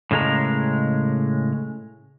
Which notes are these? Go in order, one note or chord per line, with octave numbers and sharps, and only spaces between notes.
A2 C#3 G#3 A#4 A#5